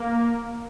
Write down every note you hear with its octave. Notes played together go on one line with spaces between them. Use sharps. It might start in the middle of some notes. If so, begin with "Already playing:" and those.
Already playing: A#3